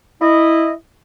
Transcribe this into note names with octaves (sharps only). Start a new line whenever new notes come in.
E4 D#5